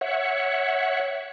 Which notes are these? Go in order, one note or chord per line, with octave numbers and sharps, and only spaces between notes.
C#5 E5 F#5